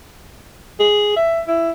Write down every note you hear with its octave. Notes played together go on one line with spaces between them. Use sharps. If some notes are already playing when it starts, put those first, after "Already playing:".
G#4
E5
E4